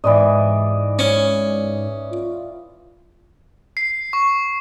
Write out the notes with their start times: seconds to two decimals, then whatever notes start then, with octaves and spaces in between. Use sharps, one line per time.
0.04 G#2 E3 D5 D#5
0.99 C#4
2.11 F4
3.77 C7
4.13 C#6